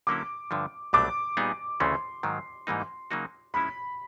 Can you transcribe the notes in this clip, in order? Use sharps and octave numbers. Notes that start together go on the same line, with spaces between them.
D3 F#3 A#3 C#4 E4 D6
G2 D3 F3
C2 B2 F#3 A3 D4 D6
A#2 G3 B3 D#4 G#4
D2 C#3 E3 A3 C#4 C6
G#2 D#3 F#3
G#2 E3 G3 A#3 D#4
C#3 F#3 A#3 D#4 F#4
F3 G#3 C#4 E4 B5